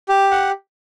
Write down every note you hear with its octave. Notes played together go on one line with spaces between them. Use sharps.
G4
F#5